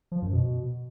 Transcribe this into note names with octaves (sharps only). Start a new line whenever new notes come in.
F3
F#2
B2